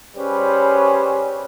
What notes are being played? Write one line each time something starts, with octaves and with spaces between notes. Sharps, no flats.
G3 C#4 G#4 B4 C5